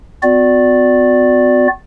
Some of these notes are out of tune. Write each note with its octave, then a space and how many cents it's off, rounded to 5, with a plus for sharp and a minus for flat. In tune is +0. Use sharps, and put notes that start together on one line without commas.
B3 +45 F#4 -25 D5 +0